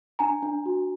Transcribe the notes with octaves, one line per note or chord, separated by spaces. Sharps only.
D4 G#5 A#5
D4
F#4